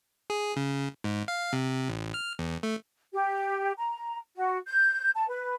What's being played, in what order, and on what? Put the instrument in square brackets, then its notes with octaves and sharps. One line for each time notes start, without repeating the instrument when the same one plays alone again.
[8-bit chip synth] G#4
C#3
G#2
F5
C3
A1
F6
E2
A3
[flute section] G4
A#5
F#4
G6
A5
B4